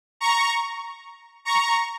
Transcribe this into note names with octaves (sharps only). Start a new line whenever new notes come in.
A#5 C#6
A#5 C#6